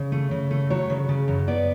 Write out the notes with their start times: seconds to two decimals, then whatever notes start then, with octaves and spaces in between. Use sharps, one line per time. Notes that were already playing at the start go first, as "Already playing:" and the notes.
Already playing: C#3
0.12 A3
0.31 C#3
0.51 A3
0.70 F#3 C#5
0.90 C#3
1.09 C#3
1.28 F#2
1.47 B3 D5